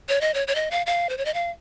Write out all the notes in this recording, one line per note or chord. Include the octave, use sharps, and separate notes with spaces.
C#5
D#5
C#5
C#5
D#5
F5
F5
C5
C#5
D#5
F5